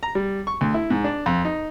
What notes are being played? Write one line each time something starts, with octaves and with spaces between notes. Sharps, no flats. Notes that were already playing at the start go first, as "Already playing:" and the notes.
A#5
G3
C#6
D2
E4
G#2
D4
F2
D#4